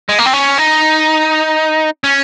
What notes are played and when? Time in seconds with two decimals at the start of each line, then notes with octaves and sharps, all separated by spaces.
0.09 G#3
0.19 A#3
0.26 C4
0.33 C#4
0.58 D#4
2.04 C#4